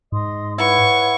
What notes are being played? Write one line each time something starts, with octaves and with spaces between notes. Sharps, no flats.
G#2 D#5 C6 D#6
E4 B4 C#5 F#5 C#6